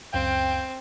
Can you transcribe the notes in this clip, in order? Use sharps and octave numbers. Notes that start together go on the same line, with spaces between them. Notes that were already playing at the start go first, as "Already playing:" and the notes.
C#2 F#2 C4 F5 G5